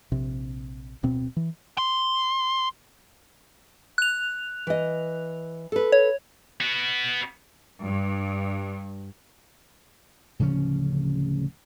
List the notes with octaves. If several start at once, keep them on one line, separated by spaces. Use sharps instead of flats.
A#1 C3
D1 B2 C4
E3
C6
F#6 F7
E3 D#5
A4 B4
C#5
B3 F#4
G2
D1 C#3 F3 C#4